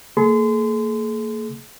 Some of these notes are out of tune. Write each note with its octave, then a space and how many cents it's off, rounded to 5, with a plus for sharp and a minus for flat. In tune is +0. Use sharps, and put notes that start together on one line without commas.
A#3 -35 G#4 +40 C6 -30